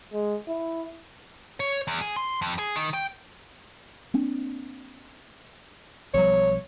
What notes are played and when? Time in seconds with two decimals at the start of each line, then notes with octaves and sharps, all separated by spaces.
0.13 G#3
0.48 E4
1.60 C#5
1.87 E2
2.01 G#4
2.16 C6
2.42 F2
2.59 G#4
2.76 D#3
2.94 G5
4.14 A#3 C4 D4
6.14 B1 F3 G3 C#5